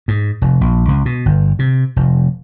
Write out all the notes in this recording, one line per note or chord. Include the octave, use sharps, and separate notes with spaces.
G#2
F1
A#1
C#2
B2
G1
C3
F1